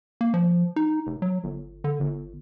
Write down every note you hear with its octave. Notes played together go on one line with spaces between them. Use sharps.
A#3
F3
D#4
F1
F#3
G1
D3
G1